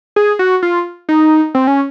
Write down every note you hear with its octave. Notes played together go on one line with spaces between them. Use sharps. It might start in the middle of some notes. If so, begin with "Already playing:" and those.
G#4
F#4
F4
D#4
C4
C#4